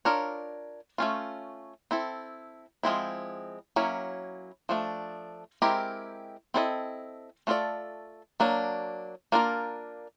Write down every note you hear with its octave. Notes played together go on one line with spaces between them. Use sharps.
D4 F4 A#4 C#5
A3 C#4 F4
C4 E4 A4
F3 G#3 C4 E4
F#3 A#3 C#4 E4
F3 A3 D4
G#3 C4 E4 G4 A#4
C4 E4 A4 C5 D#5
A3 D4 F4 A4 D5
F#3 A#3 D4
A#3 D4 F4 A#4